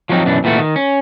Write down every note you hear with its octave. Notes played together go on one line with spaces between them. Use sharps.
F3 F#3 B3 C4 D#4
F#2 B2 E3 D4
A#2 E3 A3 B3 F#4
D#3
C#4